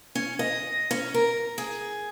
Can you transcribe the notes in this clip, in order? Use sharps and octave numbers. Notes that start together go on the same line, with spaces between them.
C#4
D#5
C#4
A#4
G#4